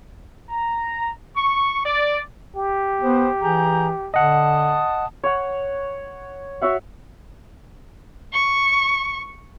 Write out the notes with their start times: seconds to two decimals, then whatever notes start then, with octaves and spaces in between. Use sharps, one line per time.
0.48 A#5
1.35 C#6
1.84 D5
2.56 G4
3.01 B3 C5
3.42 E3 G#4 A#5 G6
4.14 D3 D#5 F#5 A5 D#6
5.24 C#5 F#5
6.61 F#4 C#5 E5 F#5
8.33 C#6